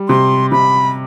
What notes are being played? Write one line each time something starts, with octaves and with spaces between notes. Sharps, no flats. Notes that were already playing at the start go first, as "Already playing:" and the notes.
Already playing: G3
C3 C6
C3 B5